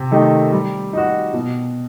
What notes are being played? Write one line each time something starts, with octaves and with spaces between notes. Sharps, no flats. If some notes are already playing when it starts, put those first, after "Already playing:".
Already playing: C3
D#3 A3 D#4 G4
G3
D#4 F#4
B2